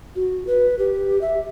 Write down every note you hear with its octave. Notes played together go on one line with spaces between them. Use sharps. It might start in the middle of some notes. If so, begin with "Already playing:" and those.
F#4
B4
G4
E5